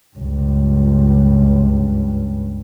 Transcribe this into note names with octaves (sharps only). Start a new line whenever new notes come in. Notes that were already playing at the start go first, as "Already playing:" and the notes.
C#2 G2